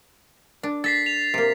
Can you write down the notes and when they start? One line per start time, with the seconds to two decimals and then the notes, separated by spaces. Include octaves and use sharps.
0.63 D4
0.84 A4 A6 B6 C7
1.06 F7
1.34 C3 A#3